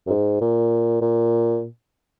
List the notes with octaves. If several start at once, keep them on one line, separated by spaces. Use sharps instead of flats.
F#2
G#2
A#2
A#2